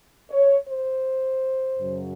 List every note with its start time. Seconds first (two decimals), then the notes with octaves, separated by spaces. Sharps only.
0.30 C#5
0.67 C5
1.79 F#2 C#3 F#3